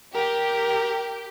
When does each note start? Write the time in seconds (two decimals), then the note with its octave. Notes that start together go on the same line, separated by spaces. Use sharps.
0.15 G4 A#4